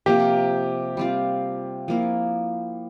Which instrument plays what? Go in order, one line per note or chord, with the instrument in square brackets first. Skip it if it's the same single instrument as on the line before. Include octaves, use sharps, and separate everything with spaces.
[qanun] C3 F3 A#3 [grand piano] G4
[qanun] G3 C4 F4
F3 A#3 E4